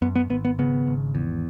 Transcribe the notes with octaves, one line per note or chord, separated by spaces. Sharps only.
F#2 B3
B3
G#1 B3
B3
C#3 B3
G#1
E2